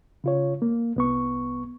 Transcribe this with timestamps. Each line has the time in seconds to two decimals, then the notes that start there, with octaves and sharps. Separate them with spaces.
0.24 C#3 F4 C#5
0.62 A#3
0.96 C2 B3 C#6